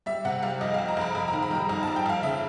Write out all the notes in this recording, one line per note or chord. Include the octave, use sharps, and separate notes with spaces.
G3 E5
C3 F#5
G3 F5
F2 D#5
F5
F2
A#5
F2 B5
F2 A#5
A#5
D#3
B5
G3 A#5
F2 A#5
A5
G3
G5
F2 F5
C#3 E5